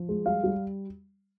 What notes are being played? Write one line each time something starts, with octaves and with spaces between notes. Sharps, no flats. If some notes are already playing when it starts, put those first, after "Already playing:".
Already playing: F3
G#3
G3 F5
G3